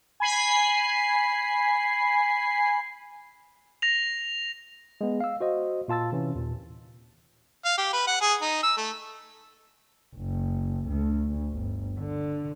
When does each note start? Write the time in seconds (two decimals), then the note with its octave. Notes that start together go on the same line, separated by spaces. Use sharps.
0.20 G#5 B5 C7
3.82 A#6 F7
5.01 G#3 B3
5.20 F5 E6
5.41 F#4 C5 D#5
5.88 A#2 F4 A5 E6 A6
6.12 C3 E3 C#4
6.35 D#2 A#2
7.65 F5
7.78 G4
7.93 B4
8.07 F#5
8.21 G#4
8.42 D#4
8.63 E6
8.77 A3
10.16 F#1
10.87 D2
11.51 G1
11.99 D3